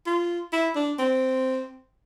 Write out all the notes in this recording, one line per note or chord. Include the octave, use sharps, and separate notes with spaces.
F4
E4
D4
C4